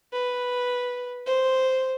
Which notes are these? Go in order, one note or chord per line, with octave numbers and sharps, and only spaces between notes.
B4
C5